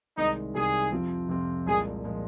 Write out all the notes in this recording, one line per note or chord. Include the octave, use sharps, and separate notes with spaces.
C2 C3 D#3 G#3 D#4
C2 C3 D#3 G#3 G#4
F2 C3 F3 C4 F4
F2 C3 F3 C4 F4
C2 A#2 F3 G#3 G#4
A#2 F3 G#3